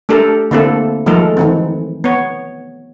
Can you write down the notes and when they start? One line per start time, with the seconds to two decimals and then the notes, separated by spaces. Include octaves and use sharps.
0.09 A3 D4 G4 A4 A#4
0.51 D3 A3 A#3 C4 E4 A4
1.06 D#3 F3 G#3 A3 A4 A#4
1.37 D#3 E3 C4
2.04 B3 C#5